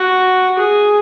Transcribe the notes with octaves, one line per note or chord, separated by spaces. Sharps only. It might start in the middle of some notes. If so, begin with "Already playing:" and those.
Already playing: F#4
G#4